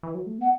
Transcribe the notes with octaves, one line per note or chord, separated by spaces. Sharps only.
E3
F#3
A3
B3 F#5